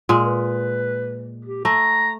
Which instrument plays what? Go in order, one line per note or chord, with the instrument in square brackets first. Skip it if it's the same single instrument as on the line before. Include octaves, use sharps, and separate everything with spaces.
[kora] A#2 G#3
[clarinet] B4
G4
[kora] A3 [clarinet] A#5